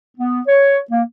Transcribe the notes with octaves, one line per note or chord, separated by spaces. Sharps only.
B3
C#5
A#3